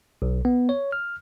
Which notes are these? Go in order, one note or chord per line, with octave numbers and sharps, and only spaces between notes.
B1
B3
C#5
F6